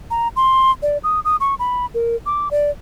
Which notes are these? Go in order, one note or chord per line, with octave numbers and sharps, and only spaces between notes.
A#5
C6
D5
D#6
D#6
C#6
B5
A#4
D6
D5